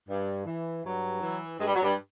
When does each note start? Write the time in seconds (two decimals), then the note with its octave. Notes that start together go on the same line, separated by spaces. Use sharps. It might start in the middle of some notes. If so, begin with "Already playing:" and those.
0.08 G2
0.45 E3
0.83 G2 F#3
1.21 E3
1.59 G2 G#3
1.67 G3
1.75 F#3
1.82 G2 G3